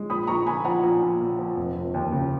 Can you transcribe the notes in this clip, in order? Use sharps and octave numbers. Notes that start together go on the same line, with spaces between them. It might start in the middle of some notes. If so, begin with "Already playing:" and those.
Already playing: G#3
A#1 B5 D#6
A#1 A#5 C#6
A#2 G#5 B5
F3 F#5 A#5
A#1
A#1
A#2
F3
F1
F1
D#2
C#3